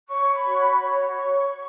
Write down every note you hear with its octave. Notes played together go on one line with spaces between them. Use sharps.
C#5 C#6
B5
F#4 C#6
B5
C#5 C#6